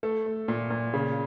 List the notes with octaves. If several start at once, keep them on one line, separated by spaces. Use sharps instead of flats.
A3 A4
A3
A#2
A#2
C#3